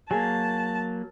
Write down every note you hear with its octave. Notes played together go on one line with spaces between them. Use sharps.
F#3 A#3 G#4 A5